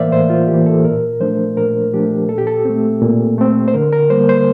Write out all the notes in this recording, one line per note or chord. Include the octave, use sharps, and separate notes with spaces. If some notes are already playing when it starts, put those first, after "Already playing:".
Already playing: A2 E3 A#3 A#4 C5 D5 E5 F5
A2 C5
F4
E3 A#3 G4
A4
A#2 A#4
F3 A3 D4 C5
A#2 A#4
F3 A3 D4 G4
A#2 A4
G4
A4
A3 C4
A#2
A3 C4
C5
D3 A#4
A#4
G3 A#3 C5
C5